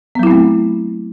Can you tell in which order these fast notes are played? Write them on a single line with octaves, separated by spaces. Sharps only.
B3 F#3 E4 C4 A3